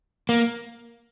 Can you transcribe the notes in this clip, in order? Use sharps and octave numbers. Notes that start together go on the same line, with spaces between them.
A#3